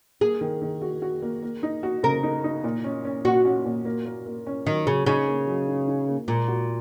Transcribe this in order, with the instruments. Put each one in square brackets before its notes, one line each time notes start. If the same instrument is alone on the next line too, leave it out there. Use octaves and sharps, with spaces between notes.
[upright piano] A#3 [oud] G#4
[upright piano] D#3
D#3
F#4
F#4
A#3
A#3
D#4
F#4
[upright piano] C#3 [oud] A#4
[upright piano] D#4
D#4
A#2
C#4
C#4
[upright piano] A#2 [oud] F#4
[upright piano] C#4
A#2
A#3
A#3
A#3
C#4
[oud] D#3 [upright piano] F#3
[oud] C#3 [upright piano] F#3
[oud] C#3 [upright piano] D#4
[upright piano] A#3
F#3
D#4
D#4
A#3
[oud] A#2 [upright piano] G#3
[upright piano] F#4